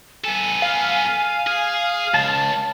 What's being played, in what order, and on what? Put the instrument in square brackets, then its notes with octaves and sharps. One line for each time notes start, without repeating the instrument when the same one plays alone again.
[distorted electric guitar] B3 A4 [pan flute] G#5
[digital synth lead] F5
[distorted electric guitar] G#4
[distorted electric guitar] C#2 [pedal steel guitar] A5